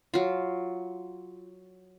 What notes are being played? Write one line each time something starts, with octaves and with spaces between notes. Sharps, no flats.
F#3 F4